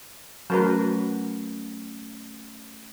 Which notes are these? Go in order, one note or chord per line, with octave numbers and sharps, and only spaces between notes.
F#3 A3 C#4 A#4 B4